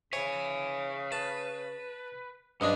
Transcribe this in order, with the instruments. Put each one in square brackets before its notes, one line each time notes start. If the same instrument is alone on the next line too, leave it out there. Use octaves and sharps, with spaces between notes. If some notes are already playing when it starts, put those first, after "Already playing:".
[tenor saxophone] C#3 [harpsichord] C#5 [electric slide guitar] E5 G#5
[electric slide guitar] B4 [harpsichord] A5
[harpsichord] G2 G#3 D4 [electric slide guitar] F#3 C#4 [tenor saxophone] D#5